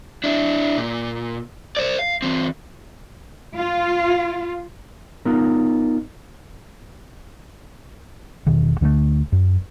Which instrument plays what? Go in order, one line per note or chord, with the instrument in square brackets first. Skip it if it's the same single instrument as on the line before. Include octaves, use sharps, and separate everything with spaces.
[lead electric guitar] D4 E4
A#2
C5 D5
F5
E3 C4
[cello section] F4
[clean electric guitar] B3 D#4 F4 A#4
[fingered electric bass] E1 B2 D#3
D2 D3 G#3 A3
F#2